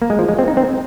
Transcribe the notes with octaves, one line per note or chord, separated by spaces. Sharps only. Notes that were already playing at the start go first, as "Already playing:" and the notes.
A#3
G#3
F3
G#3
C4
D#4
C4